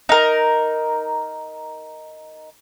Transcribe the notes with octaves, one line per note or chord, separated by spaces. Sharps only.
D#4 A#4